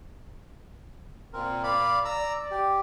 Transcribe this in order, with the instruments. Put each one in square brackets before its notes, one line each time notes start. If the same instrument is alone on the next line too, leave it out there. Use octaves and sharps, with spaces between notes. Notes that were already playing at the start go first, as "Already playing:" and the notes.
[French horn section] A#2 [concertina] C4 A#4
[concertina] D5 F5 B5
[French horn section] D5 [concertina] A#5 E6
[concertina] G4